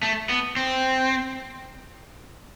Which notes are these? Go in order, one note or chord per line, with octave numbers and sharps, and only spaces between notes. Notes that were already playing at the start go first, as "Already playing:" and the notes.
A3
B3
C4